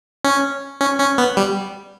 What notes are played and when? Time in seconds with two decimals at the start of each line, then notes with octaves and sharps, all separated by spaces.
0.25 C#4
0.81 C#4
1.00 C#4
1.18 B3
1.37 G3